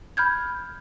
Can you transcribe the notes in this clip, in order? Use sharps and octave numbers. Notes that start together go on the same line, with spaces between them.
B5 F6 G6 G#6